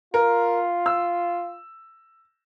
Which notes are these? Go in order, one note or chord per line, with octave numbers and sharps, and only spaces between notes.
F4 A#4
E6